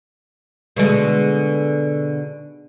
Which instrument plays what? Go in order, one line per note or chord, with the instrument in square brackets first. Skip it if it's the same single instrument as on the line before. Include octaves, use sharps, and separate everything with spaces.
[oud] B2 D3 G#3